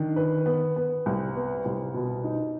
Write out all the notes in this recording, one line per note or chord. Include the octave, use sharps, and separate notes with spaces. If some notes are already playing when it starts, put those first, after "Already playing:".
Already playing: D#3 D4
B4
B3
B3
C2
B3
C2
B2
D#4